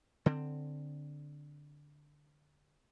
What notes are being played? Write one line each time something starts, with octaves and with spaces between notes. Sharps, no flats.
D3 C4